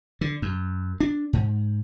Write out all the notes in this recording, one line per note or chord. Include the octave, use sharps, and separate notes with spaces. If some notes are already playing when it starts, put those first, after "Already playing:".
D3
F#2
D4
G#2